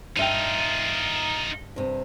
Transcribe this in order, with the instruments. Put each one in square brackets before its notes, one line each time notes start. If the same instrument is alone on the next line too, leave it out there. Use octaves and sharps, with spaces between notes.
[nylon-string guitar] G2 E5 G5 [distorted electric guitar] D#4 F4
[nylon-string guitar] G2 C3